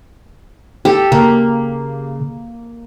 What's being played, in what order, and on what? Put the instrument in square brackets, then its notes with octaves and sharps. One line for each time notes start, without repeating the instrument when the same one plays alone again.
[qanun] G4 A4
[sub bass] C#3 [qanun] A#3